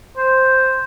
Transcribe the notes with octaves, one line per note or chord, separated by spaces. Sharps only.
C5